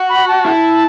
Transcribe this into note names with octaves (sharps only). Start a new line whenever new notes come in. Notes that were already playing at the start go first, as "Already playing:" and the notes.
Already playing: F#4
B5
A5
E4